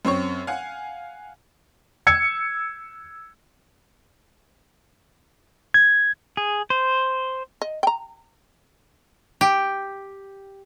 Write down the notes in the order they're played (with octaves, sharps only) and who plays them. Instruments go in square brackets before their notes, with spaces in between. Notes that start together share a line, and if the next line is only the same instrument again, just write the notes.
[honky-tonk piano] F#2 C4 C#5 C#6
F5 F#5 G#5
[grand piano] E6 G#6 C#7
[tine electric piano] G#6
[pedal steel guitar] G#4
C5
[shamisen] D#5
G5 A#5
[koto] G4